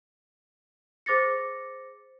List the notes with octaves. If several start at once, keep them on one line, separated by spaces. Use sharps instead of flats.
G#4 C5 D6 A6 A#6 C#7